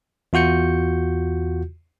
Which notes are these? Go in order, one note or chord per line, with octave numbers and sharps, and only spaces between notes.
E2 F4 F#4 G6 C#7